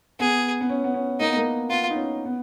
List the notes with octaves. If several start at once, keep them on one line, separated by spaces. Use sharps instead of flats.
B3 G#4
B3
C#4
B3
C#4
A#3 D#4
B3
A#3
B3 F4
D#4
C#4
B3